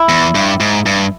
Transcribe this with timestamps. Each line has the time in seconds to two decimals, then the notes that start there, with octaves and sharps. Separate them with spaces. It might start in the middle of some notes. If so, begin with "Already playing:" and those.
Already playing: E4
0.09 E2
0.35 G2
0.60 G#2
0.86 G2